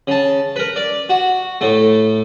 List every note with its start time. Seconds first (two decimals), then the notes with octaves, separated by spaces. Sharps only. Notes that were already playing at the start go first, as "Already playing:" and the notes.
0.07 C#3 A5
0.56 A#4 B4
0.76 D5
1.09 F#4
1.61 A2 A3